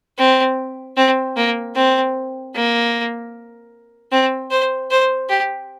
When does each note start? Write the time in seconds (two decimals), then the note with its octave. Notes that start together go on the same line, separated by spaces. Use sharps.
0.18 C4
0.97 C4
1.37 A#3
1.75 C4
2.55 A#3
4.12 C4
4.51 C5
4.91 C5
5.29 G4